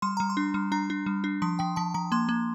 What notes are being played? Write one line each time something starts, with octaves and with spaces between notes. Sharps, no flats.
G3 C6
G3 A#5
C6
D4
G3
D4 A#5
D4
G3
D4
F3 C6
F3 G5
F3 A5
F3 A#5
A#3 C6
A#3